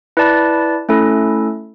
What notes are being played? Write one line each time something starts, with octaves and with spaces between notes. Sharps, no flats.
E4 B4 D5 A5
A3 C#4 E4 A4